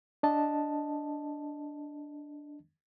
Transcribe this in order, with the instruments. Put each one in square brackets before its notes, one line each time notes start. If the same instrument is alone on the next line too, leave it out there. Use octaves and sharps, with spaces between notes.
[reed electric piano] D4 D#5 A5